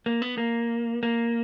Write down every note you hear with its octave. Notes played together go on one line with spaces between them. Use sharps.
A#3
B3
A#3
A#3